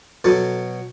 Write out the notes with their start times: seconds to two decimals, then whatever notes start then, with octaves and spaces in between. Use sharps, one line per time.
0.24 B2 F#3 A4